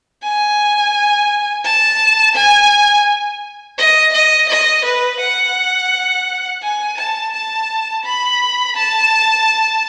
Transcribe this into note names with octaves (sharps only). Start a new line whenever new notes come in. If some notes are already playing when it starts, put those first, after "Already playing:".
G#5
A5
G#5
D#5
D#5
D#5
B4
F#5
G#5
A5
A5
B5
A5